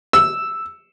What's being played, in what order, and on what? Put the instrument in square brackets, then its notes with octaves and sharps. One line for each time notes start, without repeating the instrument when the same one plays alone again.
[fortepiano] E6